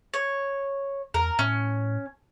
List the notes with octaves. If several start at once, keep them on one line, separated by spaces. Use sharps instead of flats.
C#5
E2 A#4
A2 C#4